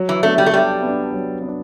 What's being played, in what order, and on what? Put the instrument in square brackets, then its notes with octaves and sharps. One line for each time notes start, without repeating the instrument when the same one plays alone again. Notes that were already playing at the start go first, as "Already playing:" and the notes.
Already playing: [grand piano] F#3
[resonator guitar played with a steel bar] E3
[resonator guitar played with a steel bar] A3 [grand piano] B3 D4
[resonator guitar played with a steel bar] G3
A3
[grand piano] F#3 [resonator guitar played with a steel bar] G3
[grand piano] B3
D4
F#3
B3
D4